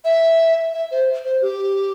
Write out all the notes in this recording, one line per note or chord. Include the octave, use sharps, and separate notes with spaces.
E5
E5
C5
C5
G4